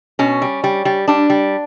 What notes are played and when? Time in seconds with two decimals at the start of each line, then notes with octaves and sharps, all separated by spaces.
0.19 B2 C#4
0.42 G3
0.64 G3
0.85 G3
1.08 G3 D4
1.30 G3